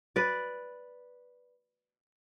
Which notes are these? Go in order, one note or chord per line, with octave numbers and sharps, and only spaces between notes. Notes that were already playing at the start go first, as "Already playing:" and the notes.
B4 D5